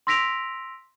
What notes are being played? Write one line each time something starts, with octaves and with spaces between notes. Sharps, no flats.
C6 E6 A#6 B6 D7 F7